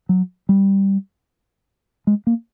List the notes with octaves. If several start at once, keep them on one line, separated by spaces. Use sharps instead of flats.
F#3
G3
G#3
A#3